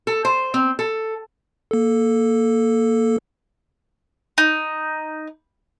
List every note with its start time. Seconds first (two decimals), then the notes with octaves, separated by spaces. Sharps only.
0.07 A4
0.25 C5
0.54 C4
0.79 A4
1.71 A#3 A4
4.38 D#4